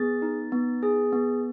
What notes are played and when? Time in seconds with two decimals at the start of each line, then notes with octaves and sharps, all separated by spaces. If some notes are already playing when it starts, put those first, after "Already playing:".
Already playing: B3 G#4 A6
0.22 D#4
0.52 B3
0.83 G#4
1.13 B3